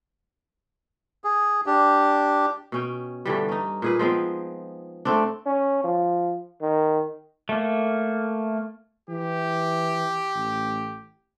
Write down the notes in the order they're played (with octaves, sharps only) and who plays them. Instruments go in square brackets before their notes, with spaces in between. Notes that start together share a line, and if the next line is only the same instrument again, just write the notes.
[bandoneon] G#4
D4 G4
[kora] B2 C#4 G5
G2 D3 E3 G3
C#4 D#4
A#2 G#4 B4
F3 G#3 B3 C4
A3 C4 D4
[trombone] C#4
F3
D#3
[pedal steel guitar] A3 A#3
[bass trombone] E3 [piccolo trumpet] G4
[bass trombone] A1